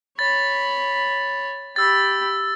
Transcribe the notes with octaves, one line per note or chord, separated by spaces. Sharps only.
C#5 B5 A6
G4 B5 E6 A6